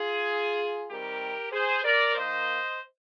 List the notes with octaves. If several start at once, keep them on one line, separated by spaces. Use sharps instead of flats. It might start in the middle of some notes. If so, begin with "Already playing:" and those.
Already playing: F4 G#4
D#3 G3 C4 G4 A#4
G#4 C5
A#4 D5
D#3 A#3 C5 D#5